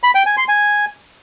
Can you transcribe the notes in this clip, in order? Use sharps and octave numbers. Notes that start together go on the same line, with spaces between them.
B5
G5
G#5
C6
G#5